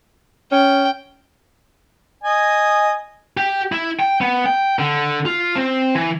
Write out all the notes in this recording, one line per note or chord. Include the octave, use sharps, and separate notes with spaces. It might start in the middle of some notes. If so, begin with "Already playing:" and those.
C#4 G5
D#5 G#5
G4
E4
G5
B3
G5
D3
F4
C4
E3